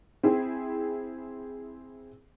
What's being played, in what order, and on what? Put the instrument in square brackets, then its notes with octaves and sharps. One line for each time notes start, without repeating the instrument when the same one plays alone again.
[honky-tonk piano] C4 E4 G#4